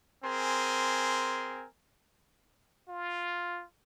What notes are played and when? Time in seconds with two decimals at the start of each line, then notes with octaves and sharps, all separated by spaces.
0.24 C4 G#4 A#4 G#5 C6
2.88 F4